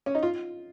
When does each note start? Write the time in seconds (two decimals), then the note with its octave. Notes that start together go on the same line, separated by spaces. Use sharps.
0.06 C#4
0.15 D#4
0.23 F4